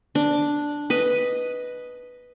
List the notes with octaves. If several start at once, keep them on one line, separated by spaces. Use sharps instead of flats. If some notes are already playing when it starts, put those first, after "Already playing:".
D4
B4 D#5